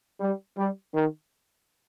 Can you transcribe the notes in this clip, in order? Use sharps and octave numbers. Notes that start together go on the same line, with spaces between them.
G3
G3
D#3